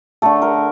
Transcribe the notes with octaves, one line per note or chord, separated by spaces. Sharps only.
D3 A3 A4
A#4